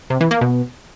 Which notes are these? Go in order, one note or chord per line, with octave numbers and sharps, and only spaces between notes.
C3
E3
A#3
B2